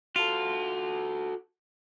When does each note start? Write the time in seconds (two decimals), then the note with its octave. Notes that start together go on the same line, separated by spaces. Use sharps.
0.16 F4 F#4 A4